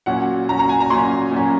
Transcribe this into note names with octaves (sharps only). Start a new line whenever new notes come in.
A#2 F#3 C#4 F#5
A#2 F#3 C#4 A#5
A#5
G#5
A#5
A#2 F#3 C#4 C6
A#2 F#3 C#4